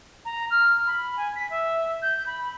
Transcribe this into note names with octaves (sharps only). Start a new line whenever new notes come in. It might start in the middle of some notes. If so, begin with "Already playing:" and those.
A#5
F6
B5
G#5
B6
E5
G6
B5